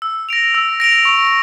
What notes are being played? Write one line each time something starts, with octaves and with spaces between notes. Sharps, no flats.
E6
A#6 D7 F7
E6
A#6 D7 F7
C#6